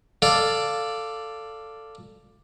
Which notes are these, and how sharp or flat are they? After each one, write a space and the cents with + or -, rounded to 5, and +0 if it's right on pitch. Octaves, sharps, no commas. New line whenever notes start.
A4 +10 D5 +0 F5 +0